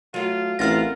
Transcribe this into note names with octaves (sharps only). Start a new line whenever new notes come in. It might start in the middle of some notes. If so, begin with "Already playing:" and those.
F#3 A3 F4
A1 C4 F4 A#4 F#5 F6 A6 A#6